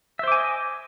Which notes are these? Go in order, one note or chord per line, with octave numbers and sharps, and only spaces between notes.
C5 D#5 E5 G#5 D6